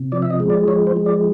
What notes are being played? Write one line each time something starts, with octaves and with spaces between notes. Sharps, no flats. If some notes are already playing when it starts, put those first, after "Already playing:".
Already playing: C3
F3 D5
E5
D#5
G#3
D5
F3 C#5
C5
G#3
D5